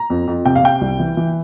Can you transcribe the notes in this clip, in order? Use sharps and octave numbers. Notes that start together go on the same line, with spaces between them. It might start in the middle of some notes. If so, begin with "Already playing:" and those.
Already playing: A#5
F2
F2
C3 G5
F5
C3 G5
C2
E3
E3